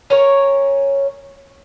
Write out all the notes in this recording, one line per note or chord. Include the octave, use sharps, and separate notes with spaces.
C#4 A#4 C#5